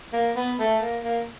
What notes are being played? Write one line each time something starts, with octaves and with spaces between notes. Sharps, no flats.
A#3
B3
A3
A#3
A#3